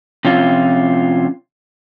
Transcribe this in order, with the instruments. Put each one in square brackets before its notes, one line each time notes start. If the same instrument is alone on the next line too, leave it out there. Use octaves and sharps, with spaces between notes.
[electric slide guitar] C3 F3 C#4 F4